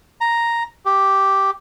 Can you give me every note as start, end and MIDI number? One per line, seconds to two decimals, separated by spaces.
0.21 0.63 82
0.85 1.51 67